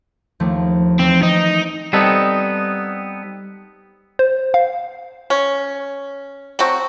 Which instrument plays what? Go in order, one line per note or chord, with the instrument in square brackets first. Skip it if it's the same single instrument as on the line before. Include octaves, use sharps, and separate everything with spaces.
[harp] D#2 F3 A3
[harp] E3 [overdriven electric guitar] C4
[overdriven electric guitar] D#4
[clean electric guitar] G3 B3 C4 D#4 A4
[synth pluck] C5
F5
[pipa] C#4
F#3 A3 C4 F#4